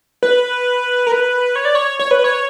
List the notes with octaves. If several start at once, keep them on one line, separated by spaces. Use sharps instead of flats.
B4
A#4
B4
C#5
D5
C#5
C#5
B4
C#5